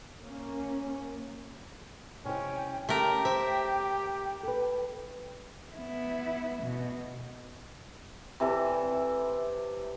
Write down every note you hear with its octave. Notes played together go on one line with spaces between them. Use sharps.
A#3 C#4
C3 C#4 E4 D#5 G5
A3 C#4 G4 A#4 G5
C5 E5
A4 B4
B3 E4
B2
C3 E3 A4 D5